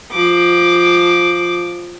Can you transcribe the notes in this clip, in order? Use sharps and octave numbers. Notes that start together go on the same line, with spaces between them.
F3 D6